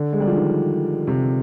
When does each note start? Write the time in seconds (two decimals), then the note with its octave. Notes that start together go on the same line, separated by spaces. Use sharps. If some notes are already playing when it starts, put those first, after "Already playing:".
Already playing: D3
0.13 G#3
0.20 G3
0.27 F3
0.36 D#3
1.07 C3